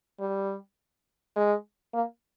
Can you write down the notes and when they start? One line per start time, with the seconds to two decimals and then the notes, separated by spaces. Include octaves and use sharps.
0.20 G3
1.36 G#3
1.94 A#3